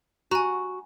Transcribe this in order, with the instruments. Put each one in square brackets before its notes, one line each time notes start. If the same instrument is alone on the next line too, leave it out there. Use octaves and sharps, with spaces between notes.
[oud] F#4 [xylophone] G#5 A#5